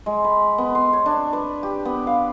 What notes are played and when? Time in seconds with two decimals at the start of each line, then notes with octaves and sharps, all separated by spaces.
0.06 G#3
0.24 B5
0.58 B3
0.75 C6
0.93 C#5
1.06 D4
1.33 B4
1.63 G4
1.85 B3
2.07 F5